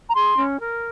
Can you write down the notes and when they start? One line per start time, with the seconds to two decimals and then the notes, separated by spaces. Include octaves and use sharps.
0.08 A#5
0.15 G#4 C6
0.37 C#4
0.60 A#4